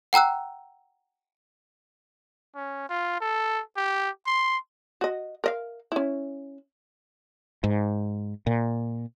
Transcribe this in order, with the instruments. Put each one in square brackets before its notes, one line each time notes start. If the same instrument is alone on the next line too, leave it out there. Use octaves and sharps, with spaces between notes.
[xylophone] F#5 G5 A#5 E6 F#6
[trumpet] C#4
F4
A4
G4
C6
[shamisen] F#4 D#5
A#4 D#5 F5
C#4 E4
[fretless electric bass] G#2
A#2